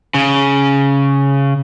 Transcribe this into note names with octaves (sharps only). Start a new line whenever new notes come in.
C#3